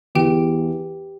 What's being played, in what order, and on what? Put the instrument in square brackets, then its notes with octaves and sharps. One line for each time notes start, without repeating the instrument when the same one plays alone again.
[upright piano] E2 [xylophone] G4 G5